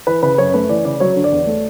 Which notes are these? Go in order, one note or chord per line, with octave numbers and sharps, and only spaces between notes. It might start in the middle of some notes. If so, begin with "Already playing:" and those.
E3 B4
C#3 B4
F#2 C#5
A3 B4
E3 D5
C#3 D5
F#3 C#5
D3
D5
E2
A3